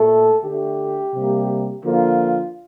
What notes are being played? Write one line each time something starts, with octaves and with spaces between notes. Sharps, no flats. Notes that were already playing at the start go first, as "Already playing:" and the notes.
Already playing: A#2 A3 A4
D3 A3 G4
C3 G3 A#3
D3 F3 A#3 F4